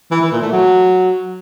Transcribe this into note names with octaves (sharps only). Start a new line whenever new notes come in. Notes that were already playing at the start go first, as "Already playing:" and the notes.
E3
E3
A#2
A3
F#3